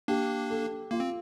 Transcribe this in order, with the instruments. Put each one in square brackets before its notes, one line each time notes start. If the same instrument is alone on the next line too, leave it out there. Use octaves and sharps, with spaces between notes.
[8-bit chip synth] A#3 D4 [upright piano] G4
[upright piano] A4
[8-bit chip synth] A#3 [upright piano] F4
[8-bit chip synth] C4